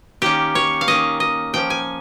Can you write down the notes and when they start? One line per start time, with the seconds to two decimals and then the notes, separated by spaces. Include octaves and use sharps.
0.22 D#3 A#3 C#4 G4
0.55 C#5
0.81 F5
0.88 D#3 A#3 C#4 D#5
1.20 D#5
1.54 F3 A#3 C#4 G5
1.70 G#5